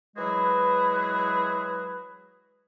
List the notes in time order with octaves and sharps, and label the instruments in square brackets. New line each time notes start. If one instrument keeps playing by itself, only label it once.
[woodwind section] E3 F#3 G#3 F#4 G#4 B4